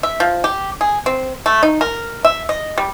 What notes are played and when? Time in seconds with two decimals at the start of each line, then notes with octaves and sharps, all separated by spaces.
0.03 E5
0.20 F3
0.44 G4
0.81 G#4
1.06 C4
1.46 A3
1.63 D#4
1.81 A#4
2.25 E5
2.49 D#5
2.78 G3